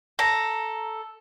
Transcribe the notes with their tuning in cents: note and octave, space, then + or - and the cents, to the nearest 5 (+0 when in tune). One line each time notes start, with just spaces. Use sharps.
A4 +0 A#5 +0